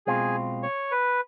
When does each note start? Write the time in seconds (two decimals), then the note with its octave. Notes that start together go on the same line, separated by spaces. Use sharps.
0.07 B1 B2 G#3 C4 F4 G#4
0.63 C#5
0.91 B4